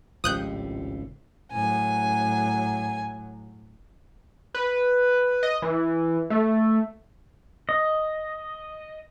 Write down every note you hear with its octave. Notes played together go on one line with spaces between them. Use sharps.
G#1 C#2 A2 F3 G4 D#6 F#6 G6
A2 F#3 G#5
B4
D#5
E3
A3
D#5